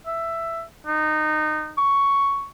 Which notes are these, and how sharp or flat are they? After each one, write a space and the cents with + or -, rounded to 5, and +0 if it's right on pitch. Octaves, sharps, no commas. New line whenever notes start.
E5 +10
D#4 -20
C#6 +5